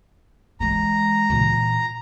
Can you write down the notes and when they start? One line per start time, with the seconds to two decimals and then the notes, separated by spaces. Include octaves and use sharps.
0.60 E3 G#3 A#5
1.30 A#2 E3